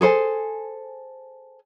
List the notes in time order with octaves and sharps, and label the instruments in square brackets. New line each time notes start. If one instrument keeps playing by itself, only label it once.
[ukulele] G#4 A4 C5 G#5